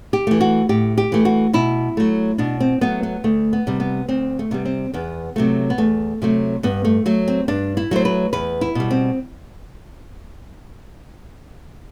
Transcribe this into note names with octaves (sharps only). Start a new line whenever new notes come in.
G4
E3 A3
F#4
A2 G4
G4
E3 A3
F#4
B2 E4
F#3 A3
B2 D4
C4
F#3 A3 B3
B3
D2 A3
B3
C3 G3
B3
D2 C4
A3
C3 G3 B3
C4
E2 B3
C3 F#3 A3
B3
E2 A3
C3 F#3 A3
G2 B3
A3
F#3 A3
C4
G2 D4
E4
F#3 A3 C5
B4
E2 B4
E4
B2 G3
C4